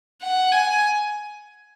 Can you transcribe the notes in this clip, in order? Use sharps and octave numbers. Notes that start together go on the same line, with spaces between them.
F#5
G#5